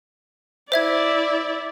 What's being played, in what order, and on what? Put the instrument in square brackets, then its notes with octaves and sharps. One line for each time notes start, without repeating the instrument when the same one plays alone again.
[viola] E4 D5 [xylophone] C5 E5 G#6